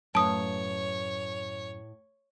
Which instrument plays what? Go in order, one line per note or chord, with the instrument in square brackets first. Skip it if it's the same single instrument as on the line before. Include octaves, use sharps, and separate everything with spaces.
[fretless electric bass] F#2 [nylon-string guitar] A2 B4 F5 [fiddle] C#5 [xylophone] A5 D#6